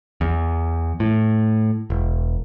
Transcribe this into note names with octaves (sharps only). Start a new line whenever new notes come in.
E2
A2
E1